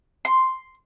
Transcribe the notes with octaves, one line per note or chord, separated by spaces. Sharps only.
C6